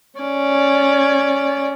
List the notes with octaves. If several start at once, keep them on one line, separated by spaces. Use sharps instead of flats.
C#4 D5